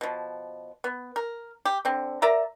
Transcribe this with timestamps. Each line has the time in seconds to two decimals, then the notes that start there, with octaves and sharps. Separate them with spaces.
0.01 B2 F3
0.84 B3
1.16 A#4
1.65 G4
1.85 D3 C4
2.22 A#4 D5 E5 A#5